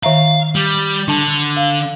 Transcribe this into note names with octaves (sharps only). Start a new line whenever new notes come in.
D#3 E5 F5 A#5
G3
D3 D4 A5
F5